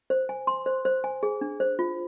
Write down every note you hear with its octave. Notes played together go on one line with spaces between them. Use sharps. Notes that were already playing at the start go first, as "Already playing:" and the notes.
C5
G#5
C6
C5
C5
G#5
G#4
D4
C5
F4